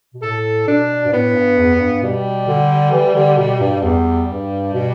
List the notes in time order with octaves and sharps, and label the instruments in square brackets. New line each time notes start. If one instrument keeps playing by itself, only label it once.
[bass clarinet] B2
[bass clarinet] A2 [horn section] A4
[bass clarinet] B2 [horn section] D4
[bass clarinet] G2
[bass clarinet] A2 [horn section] B3
[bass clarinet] G2
E2
E2
G2
[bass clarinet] B2 [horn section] G3
[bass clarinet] D3
E3
D3
B2
G2
[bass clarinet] E2 [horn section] G3
[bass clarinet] G2
B2